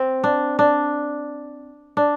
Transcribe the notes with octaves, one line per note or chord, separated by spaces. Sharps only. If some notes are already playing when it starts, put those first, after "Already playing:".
Already playing: C4
D4
D4
D4